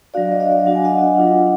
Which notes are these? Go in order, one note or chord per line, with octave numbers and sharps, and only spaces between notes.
F#3 D4 F#4 D5 F5
D#5
D5 F5
F#3 D4 F#4 F#5
G#5
D#5 F#5
F#3 D4 F4